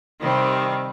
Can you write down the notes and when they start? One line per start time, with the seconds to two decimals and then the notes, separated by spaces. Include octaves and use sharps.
0.21 C3 D#3 G3 C4